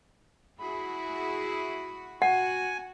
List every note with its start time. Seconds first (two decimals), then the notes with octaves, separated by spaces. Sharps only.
0.59 E4 F#4 G#4 B5
2.22 F#4 F#5 G#5